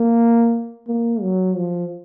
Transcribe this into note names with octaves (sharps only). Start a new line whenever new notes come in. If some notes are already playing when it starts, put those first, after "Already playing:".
Already playing: A#3
A#3
F#3
F3